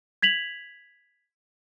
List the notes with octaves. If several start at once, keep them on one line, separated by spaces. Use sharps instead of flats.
G#6 B6 F7 F#7